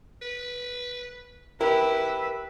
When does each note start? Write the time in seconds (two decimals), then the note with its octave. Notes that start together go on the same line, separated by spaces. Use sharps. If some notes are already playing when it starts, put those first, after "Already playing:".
0.22 B4
1.61 E4 G4 A#4 B4 E5